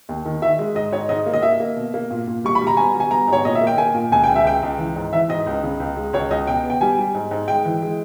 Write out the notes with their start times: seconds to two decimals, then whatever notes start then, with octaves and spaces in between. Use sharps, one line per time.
0.09 D#2
0.25 D#3
0.42 D#3 E5
0.59 G#3
0.75 G#2 D#5
0.92 G#2 C#5
1.09 G#2 D#5
1.26 A#3
1.33 D#5
1.42 A#3 E5
1.60 A#3
1.76 B2
1.94 A#3
2.11 A#2
2.27 A#2
2.44 G3 C#6
2.55 B5
2.61 G3
2.67 A#5
2.77 B3 G#5
2.95 G3
3.00 G#5
3.11 B3 A#5
3.28 G#2
3.33 C#5
3.45 A#2 D#5
3.55 E5
3.61 A#3
3.67 G5
3.78 A#3 G#5
3.94 A#2
4.12 C#2 G#5
4.24 G5
4.29 C#2
4.36 E5
4.45 C#2 G5
4.63 C#2
4.78 E3
4.96 G#2
5.13 E3 E5
5.29 G#2 D#5
5.46 C#2
5.63 C#3
5.80 C#2
5.96 G#3
6.13 C#2 C#5
6.30 C#2 D#5
6.47 B2 G5
6.64 B3
6.70 G5
6.81 G3 G#5
6.98 G3
7.14 G#2
7.31 G#2
7.47 G#3 G5
7.65 E3
7.82 G#3